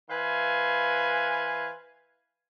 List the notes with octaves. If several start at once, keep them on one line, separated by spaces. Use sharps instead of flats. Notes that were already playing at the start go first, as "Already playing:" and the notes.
E3 B4 C5 F5 G#5